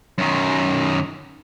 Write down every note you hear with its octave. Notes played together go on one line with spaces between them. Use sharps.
F#2 D#3